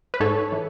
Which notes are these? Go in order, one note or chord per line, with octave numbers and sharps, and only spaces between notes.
B4
G#2 A4 C#5
E3